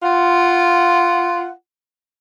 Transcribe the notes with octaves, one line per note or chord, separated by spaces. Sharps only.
F4 F#5